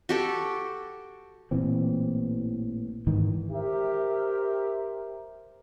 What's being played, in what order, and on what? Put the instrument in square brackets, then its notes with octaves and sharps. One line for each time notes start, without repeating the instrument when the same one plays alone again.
[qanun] F#4 G4 A4
[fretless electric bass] A1 A#2 E3 C4
G#2 D#3 E3
[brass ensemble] G4 A#4 C5 E5